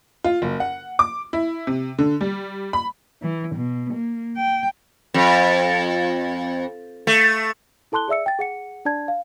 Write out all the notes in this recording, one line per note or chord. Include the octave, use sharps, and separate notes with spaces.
F4
F#1
F#5
D6
E4
C3
D3
G3
B5
E3
B2
A#3
G5
F2
A3
E4 A4 A5 C6 F#6 G7
G#4 D5 E5 E6 C#7
G5 A6
G#4 F#5 C#7
D4 D5 A5 G#6
F5